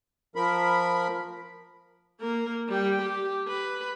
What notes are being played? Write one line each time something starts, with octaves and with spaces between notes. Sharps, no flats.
F3 A#4 B5
A#3 A#4
G3 G5
G4
B4